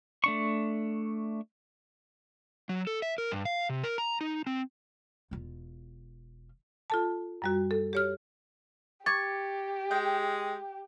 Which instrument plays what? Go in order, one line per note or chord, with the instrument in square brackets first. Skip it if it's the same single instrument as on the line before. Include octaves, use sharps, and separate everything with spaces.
[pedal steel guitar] A3 D4 C#6
[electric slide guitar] F#3
A4
E5
A#4
G2
F5
C3
A#4
A#5
D#4
C4
[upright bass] E1 F4
[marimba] F4 A4 A5
F#2 G3 F#4
A4
G4 C#5 F6
[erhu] G4 [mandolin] C#6 [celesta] D6 G#6 A6
[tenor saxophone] G#3 [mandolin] G5